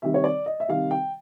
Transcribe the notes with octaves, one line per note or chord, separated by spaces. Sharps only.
C3 D#3 G3 E5
C#5
D5
D#5
E5
C3 D#3 G3 F5
G5